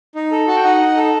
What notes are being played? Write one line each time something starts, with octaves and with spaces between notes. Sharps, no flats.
D#4
A4
F#4 A5
G5
D#4 D#5 F#5
D#4
A4